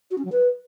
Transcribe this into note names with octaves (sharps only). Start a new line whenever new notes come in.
F#4
C#4
F#3
B4